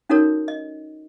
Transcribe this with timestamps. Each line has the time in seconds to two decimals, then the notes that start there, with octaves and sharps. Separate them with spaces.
0.10 C#4 D#4 F#4 A4 A#4 C#5
0.48 D#5